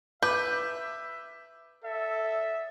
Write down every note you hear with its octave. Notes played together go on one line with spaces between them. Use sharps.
B4 E5 D6 G6
A4 E5